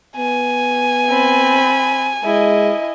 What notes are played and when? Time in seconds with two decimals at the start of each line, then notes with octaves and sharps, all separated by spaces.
0.16 B3 G#5
1.09 C4 B5
2.24 G#3 E4 D#5